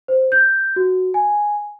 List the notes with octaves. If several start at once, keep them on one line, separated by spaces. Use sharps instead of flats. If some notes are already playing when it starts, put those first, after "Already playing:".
C5
G6
F#4
G#5